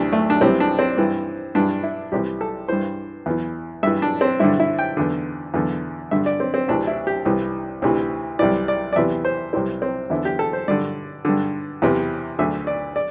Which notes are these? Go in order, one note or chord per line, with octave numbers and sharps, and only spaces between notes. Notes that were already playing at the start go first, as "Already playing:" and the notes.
Already playing: D2 C3 E3 D4
A3
D4
C2 C3 E3 C4
D4
C4
G2 E3
G2 E3 D4
E4
C2 C3 E3 G4
A4
G2 E3 C5
E2 E3
G2 E3 E5
D4
C4
G2 D3 E4
E4
G5
E2 D3
E2 D3
G2 D3 E5
D5
C4
C4
D2 C3 E3 D4
E4
G4
C2 C3 E3
D2 C3 E3
C2 C3 E3 D5
D5
D5
E2 C3 E3 E5
C5
C2 C3 E3 C4
C4
E2 D3 E4
G4
A4
C5
G2 D3 D5
G2 D3
E2 C3 E3
D2 D3 E5
D5
D5